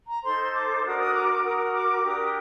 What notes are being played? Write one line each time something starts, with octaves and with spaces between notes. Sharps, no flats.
A#5
D#4 A4 C5 C6
D6
D4 F#4 A#4 D#6
D#6
D6
D6
F#4 A#4 D#6
D6
D4 G4 A#4 D#6